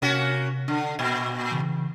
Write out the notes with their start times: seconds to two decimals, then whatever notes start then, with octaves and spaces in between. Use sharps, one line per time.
0.02 C3 A#3 C#4 F#4
0.68 D3 D4
0.99 A#2 G5 G#6
1.52 C#3 E3